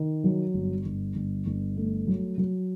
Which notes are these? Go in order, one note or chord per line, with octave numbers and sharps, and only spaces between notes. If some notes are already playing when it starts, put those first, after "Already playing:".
Already playing: D#3
F#3
G1
G1
G1
G1
A3
F#3
F#3